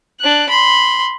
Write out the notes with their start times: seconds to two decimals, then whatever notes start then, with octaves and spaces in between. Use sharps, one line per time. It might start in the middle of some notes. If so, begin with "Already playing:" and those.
0.20 D4 F#6
0.49 B5 C6